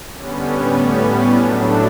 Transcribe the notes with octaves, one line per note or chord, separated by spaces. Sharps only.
D3 G3 B3 C#4
A2 G3 B3
A2 G3 B3
A2 F#3 A3 D4